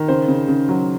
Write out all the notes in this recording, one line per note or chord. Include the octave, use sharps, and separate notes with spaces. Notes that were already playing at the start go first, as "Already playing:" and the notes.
Already playing: D#3
C#3 C5
C#3
C#3
F#3